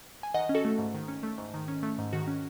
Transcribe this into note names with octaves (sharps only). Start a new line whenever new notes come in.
G#5
D#3 D#5 F#5
C#4
F#4 A4
A3
G#2
D#3
C#4
A3
G#2
D#3
C#4
A3
G#2
D#3 F#4
C#4